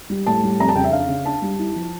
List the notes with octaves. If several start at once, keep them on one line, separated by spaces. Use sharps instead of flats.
G3
A2 A5
G3
F2 A#5
A5
C#3 G5
E5
D4 F5
C#3
D4 A5
G3
E4
F3